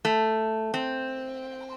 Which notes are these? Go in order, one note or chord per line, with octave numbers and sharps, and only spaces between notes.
A3
C4